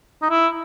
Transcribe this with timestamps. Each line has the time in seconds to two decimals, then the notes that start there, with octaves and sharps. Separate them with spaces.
0.22 D#4
0.30 E4